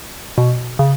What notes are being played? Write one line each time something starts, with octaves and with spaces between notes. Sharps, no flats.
B2
C#3